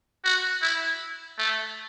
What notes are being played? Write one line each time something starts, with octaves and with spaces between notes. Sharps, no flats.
F#4
E4
A3